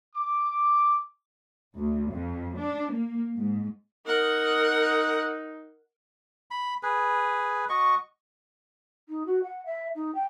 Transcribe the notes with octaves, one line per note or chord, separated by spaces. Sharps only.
D6
D2
F2
D4
A#3
G#2
D#4 A#4 F#5
B5
G#4 B4
F#4 D#5 C#6
D#4
F#4
F#5
E5
D#4
G5